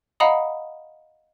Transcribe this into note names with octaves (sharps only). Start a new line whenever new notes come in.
D#5 F5 F#5 A#5 B5 D#6